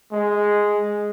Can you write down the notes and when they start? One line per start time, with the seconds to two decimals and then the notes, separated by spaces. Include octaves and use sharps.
0.12 G#3